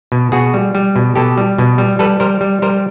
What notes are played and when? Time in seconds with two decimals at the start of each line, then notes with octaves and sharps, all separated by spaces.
0.12 B2
0.32 B2 F#4 G#4
0.54 G3
0.75 G3
0.96 B2
1.15 B2 G4 A4
1.38 G3
1.58 B2
1.78 G3
1.99 G3 A4 B4
2.20 G3 A#4 C5
2.41 G3
2.62 G3 A#4 C5